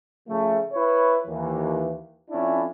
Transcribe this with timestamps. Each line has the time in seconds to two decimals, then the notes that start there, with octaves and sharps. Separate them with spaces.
0.28 C#3 F3 A3
0.73 E4 B4 C#5
1.27 D#2 E3
2.30 F2 C#4 D4 E4